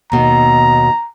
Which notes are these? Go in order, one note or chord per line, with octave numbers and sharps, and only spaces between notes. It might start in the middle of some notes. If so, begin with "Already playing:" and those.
D#2 B2 A#5